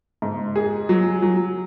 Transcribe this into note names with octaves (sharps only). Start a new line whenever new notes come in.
G#2
G#4
F#3
F#3